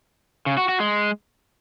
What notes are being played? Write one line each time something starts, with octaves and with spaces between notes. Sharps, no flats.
C#3
F#4
F#4
G#3